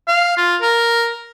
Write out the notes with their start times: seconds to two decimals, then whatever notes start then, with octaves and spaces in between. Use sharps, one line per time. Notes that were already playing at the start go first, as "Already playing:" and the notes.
0.08 F5
0.37 F4
0.62 A#4